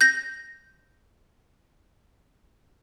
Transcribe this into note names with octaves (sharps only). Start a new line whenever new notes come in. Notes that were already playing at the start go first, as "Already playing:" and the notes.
G6 A#6